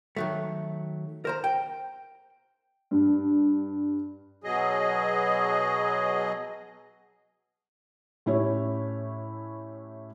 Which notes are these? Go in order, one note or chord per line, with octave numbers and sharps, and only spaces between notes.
D#3 F#3 A3
A#4 C5 A#5
G5
G2
B2 F#3 G#4 D#5
A2 C#4 E4 G4 C#5